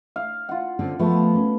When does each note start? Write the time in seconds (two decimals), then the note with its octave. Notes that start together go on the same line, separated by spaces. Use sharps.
0.16 F5
0.49 F4 F#5
0.79 D3 C4 C#4
0.99 F3 A3 B3
1.35 C#4